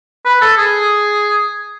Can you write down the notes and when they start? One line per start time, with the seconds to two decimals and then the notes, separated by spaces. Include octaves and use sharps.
0.25 B4
0.42 A4
0.58 G#4